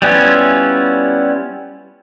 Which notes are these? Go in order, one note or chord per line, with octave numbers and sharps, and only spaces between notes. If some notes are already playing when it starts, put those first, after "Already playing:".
G3 B3 C#4 E4 F4